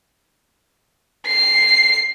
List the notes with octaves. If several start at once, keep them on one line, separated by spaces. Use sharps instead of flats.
C7